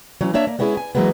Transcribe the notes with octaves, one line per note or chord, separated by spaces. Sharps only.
E3 F#3 C#4
A#3 D4 C#5 E5
A#3
G#3 B3 C#4 E4 G#4
G#5
E3 F#3 G#3 A#3 B3